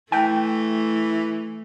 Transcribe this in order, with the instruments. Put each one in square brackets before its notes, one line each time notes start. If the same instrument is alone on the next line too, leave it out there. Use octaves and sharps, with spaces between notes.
[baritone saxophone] E3 [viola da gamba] A3 [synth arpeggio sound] G5